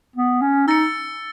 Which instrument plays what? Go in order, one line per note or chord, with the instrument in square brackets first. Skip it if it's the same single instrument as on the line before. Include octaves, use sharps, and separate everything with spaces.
[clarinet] B3
C#4
[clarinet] D#4 [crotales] E6 A6 C#7